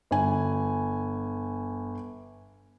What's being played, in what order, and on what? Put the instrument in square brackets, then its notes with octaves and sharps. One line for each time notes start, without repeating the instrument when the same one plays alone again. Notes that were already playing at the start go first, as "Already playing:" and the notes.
[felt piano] G1 G#5